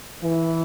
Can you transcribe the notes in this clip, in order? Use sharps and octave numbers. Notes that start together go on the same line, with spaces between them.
E3